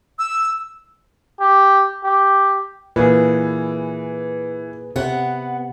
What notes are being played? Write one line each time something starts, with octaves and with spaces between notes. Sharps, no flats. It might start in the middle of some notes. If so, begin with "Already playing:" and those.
E6
G4
G4
A#2 E3 G#4 B4
C3 B3 F#5